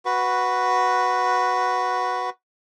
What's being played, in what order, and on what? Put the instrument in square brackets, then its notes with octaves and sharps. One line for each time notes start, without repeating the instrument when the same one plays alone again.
[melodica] F#4 B4